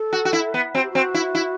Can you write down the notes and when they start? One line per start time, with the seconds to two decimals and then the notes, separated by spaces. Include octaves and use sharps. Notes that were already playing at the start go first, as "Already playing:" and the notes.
Already playing: A4
0.13 F#4
0.25 F#4
0.33 E4
0.54 B3
0.74 C4 F#4
0.82 G4
0.90 C4 F#4
1.14 E4
1.35 E4